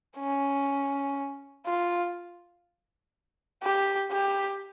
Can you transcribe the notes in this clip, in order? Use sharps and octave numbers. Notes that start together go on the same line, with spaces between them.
C#4
F4
G4
G4